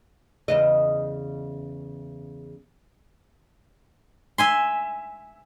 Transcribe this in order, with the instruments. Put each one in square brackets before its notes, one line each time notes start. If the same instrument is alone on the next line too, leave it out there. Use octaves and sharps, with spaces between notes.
[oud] E2 C#3 D#5
[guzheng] E5 G#5 C6